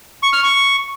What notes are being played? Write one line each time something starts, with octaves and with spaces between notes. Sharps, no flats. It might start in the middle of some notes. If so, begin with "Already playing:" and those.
C#6
F6
C#6